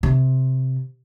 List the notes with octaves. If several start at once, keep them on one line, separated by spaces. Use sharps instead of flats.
C3